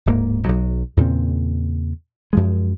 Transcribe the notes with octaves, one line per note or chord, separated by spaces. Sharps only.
D1 G#2 A#3
B1 F#3
E2 A#2 C#3 C4
F#2 F3 G#3